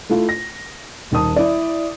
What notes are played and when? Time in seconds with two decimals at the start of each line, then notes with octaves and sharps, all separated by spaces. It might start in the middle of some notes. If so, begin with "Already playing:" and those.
0.09 A3 E4 F4
0.29 A#6
1.11 D#1 D#3 A5 D#6
1.36 E4 D5